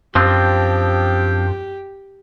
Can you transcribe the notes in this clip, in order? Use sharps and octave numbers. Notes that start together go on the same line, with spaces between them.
F#2 F3 C4 D4 G4